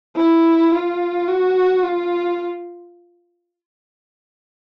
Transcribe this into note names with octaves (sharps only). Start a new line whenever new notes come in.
E4
F4
F#4
F4